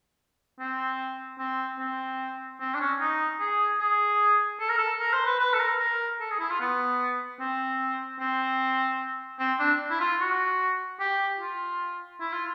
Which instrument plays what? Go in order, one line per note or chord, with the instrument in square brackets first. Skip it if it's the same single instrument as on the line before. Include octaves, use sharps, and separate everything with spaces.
[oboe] C4
C4
C4
C4
D4
C#4
D#4
G#4
G#4
A4
A#4
A4
A#4
C5
B4
B4
A4
A#4
A#4
A4
G#4
E4
F4
B3
C4
C4
C4
D4
E4
F4
F#4
G4
F4
E4
F4